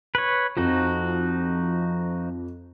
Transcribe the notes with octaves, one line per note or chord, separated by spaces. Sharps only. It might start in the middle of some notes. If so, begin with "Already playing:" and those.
B4 C#5
F2 F3 D#4 F#4